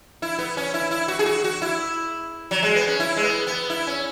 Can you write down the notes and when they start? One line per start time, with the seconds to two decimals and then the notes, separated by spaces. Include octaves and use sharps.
0.22 E4
0.39 B3
0.57 C#4
0.74 E4
0.91 E4
1.08 F#4
1.19 G#4
1.26 F#4
1.44 F#4
1.62 E4
2.51 F#3
2.63 G#3
2.76 B3
2.87 C#4
3.00 E4
3.16 G#3
3.23 B3
3.47 B3
3.70 E4
3.87 C#4